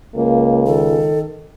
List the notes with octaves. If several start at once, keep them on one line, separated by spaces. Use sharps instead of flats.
C#2 A#3
D#3 A4